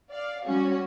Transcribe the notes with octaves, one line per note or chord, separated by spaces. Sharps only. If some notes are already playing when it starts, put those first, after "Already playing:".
D5 F5
G3 C#4 F#4 C#5